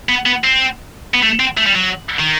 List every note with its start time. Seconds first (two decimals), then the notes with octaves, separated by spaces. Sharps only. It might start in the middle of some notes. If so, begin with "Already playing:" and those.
0.09 B3
0.26 B3
0.44 C4
1.14 B3
1.23 A3
1.40 C4
1.57 A3
1.66 G3
1.75 F#3
2.19 D#3